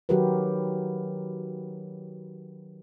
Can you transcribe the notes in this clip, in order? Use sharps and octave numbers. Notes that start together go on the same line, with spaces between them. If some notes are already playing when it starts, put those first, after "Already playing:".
D#3 F#3 F#4 G4 A#4 B4